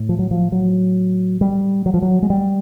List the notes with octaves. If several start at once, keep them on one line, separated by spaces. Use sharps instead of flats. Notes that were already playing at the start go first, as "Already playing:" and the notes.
Already playing: A2
F3
F#3
F3
F#3
G3
F#3
F3
F#3
G#3
G3